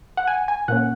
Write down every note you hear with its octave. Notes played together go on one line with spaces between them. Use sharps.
F#5
G#5
G#5
A#2 A#3 C#4 F#5